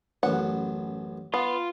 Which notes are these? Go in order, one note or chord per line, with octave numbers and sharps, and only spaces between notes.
A1 F#2 B3 F#5
B3 F4